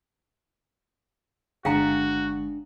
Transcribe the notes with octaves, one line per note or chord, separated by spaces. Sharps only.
G1 G#3 D4 F#4 G#4 F5 G5 A#5